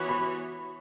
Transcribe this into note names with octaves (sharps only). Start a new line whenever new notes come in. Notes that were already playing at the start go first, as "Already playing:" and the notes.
Already playing: E3 B3 F#4 C#5
B5